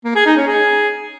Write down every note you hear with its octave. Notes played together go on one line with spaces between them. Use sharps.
A#3
G#4
D#4
C#4
G#4